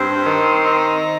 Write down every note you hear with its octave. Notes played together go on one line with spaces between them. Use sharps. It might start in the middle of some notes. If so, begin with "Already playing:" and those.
Already playing: G2 C4
D#3
D#4